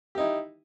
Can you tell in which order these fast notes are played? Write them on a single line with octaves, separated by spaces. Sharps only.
G4 D#4 E4